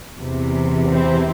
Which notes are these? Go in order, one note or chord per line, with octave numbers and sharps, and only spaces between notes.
E2 C3 E3
C4 E4